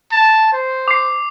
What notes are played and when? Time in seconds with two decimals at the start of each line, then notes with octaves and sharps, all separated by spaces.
0.12 A5
0.53 C5
0.88 D6 C7